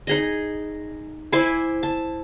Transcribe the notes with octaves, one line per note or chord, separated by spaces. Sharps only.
D#4 G#4 D#5
E4 C5 G#5 D6
A5